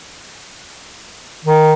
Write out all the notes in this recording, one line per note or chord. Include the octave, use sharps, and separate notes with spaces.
D#3